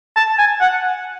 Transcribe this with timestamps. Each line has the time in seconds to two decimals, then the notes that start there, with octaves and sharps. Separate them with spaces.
0.16 A5
0.38 G#5
0.61 F#5